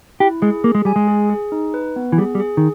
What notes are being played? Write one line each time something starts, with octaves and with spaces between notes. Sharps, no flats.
E4 G4
G#3 G#4
A#3 G#4
G#3
G3 G#5
G#3
G#4
G#4
D#4
B4
B3
E3
G3 G#4
G3
G#4
D#3